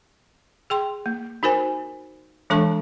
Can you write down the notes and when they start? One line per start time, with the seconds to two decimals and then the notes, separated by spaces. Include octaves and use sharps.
0.70 G#4 G5 C6
1.06 A#3
1.43 D#4 F#4 A#4 C5 G#5
2.50 E3 G#3 D4 A4 A5 C#6